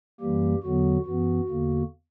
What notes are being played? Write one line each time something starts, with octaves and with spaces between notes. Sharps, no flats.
F#2 E3 G3 A#3 G4
E2 D3 F#3 B3 F#4
F#2 E3 B3 F#4
E2 D3 A#3